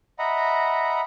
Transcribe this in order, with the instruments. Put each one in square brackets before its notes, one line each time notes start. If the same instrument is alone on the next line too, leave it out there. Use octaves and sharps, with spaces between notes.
[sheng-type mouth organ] D#5 E5 F#5 A#5 B5